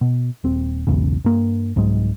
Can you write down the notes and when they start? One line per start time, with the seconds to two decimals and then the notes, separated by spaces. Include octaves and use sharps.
0.01 B2
0.44 D#1 C4
0.87 B1 E2 G#2 C#3
1.24 G2 A#3
1.76 C2 G#2 F#3 G#3